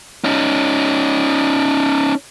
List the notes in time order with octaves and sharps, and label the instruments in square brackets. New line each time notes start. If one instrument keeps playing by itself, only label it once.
[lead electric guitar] C#4 D#4